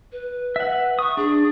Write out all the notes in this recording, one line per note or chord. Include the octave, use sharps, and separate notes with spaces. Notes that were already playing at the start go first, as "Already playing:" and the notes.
B4
E5 F#5
C#6 D#6
D4 G#4